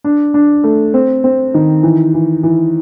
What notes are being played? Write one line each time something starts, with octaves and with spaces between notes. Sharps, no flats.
D4
D4
A3
C4
C4
D#3
E3
E3
E3